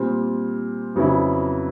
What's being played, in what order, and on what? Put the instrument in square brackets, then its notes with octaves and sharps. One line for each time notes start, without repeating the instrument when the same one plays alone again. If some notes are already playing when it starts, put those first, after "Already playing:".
Already playing: [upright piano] A#2 G3 C4
F2 C#3 F#3 B3 E4